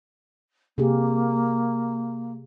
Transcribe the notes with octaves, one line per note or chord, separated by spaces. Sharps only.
C3 A#3 G4 G#4